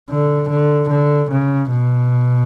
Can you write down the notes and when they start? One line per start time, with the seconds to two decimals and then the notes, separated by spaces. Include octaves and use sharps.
0.10 D3
0.50 D3
0.90 D3
1.31 C#3
1.71 B2